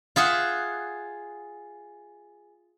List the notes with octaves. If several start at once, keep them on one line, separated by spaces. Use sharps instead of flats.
F4 G#4 E5 F#5